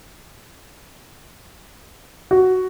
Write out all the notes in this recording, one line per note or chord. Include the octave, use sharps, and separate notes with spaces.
F#4